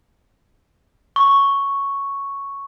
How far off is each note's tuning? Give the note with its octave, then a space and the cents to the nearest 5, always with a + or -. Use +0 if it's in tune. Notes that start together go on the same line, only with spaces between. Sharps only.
C#6 +0